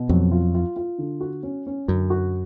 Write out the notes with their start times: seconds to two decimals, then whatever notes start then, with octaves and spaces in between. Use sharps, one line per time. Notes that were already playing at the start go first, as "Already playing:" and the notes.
Already playing: B2
0.09 F2 F#3
0.32 F4
0.55 F4
0.76 F4
0.98 D3
1.21 F#4
1.43 C#4
1.67 C#4
1.88 F#2 D3
2.10 F#4